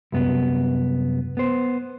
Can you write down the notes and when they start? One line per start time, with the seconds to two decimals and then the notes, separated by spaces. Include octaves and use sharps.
0.12 C2 F#2 B3
1.37 B3 C5